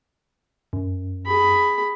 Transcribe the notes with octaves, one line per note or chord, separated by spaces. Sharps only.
F#2
G#4 B5